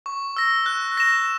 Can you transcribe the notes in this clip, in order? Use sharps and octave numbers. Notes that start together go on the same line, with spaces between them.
C#6
E6 A#6
F#6
A#6 E7